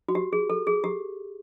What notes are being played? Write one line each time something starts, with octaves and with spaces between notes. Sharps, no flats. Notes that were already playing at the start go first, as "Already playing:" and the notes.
F#4
G4
G#4
A4
G#4
G4